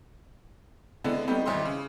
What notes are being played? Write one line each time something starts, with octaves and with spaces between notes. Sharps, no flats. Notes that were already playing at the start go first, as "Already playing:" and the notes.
D3 G#3 B3 C4 D4 E4
G3 A3 B3 C4 D#4 G4
G#1 E2 G3 D#5 E5 C6
C#3